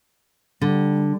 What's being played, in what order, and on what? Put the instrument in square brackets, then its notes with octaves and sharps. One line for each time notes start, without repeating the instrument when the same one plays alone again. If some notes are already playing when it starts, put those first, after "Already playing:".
[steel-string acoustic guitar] D3 [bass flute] G3